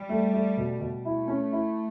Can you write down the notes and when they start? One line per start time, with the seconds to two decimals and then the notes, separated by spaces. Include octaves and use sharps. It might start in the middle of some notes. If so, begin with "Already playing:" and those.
Already playing: G3
0.09 A3
0.33 A3
0.57 B2
0.80 B2
1.04 A3 E4
1.28 C#4
1.52 E4